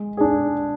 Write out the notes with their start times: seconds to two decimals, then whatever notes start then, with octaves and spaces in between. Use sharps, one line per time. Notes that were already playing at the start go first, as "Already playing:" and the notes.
Already playing: G#3
0.17 D4 G#4